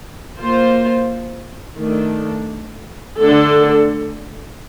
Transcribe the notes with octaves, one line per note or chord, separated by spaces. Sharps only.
A#3 F4 C5
D#3 A3 D4 A4
D3 A3 D4 A4